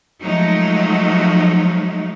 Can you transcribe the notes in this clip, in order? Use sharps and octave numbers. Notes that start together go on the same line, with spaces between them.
F3 F#3 G#3 A3 D#4